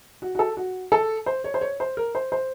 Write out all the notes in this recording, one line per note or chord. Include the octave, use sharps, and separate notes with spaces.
F#4
F#4
A4
F#4
A4
C5
C#5
C5
C#5
C5
A#4
C5
C5